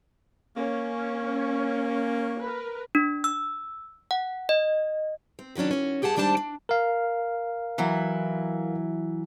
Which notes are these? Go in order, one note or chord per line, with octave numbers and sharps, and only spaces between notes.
A#3 C#4
A#4 B4
D4
E6
F#5
D#5
C4
D#3 E3 F#3 C#4 D4
C#4 F#4
G2 G4 G#4 F#5 A5
D#2 G#2 G3 D4 C5 A5
D4
A#4 F5
E3 F#3 E4